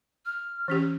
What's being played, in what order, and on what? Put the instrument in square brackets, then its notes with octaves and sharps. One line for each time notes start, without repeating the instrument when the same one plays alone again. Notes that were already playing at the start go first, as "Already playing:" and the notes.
[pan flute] F6
[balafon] E3 C#4 G4